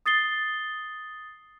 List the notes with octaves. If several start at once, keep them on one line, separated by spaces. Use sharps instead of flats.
D#6 A6 C7 G7